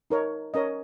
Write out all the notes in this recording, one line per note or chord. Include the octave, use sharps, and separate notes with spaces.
D#4 A#4 C#5
C#4 A#4 C#5 D#5